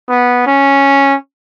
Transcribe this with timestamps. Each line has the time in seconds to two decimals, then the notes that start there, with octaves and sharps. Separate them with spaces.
0.09 B3
0.46 C#4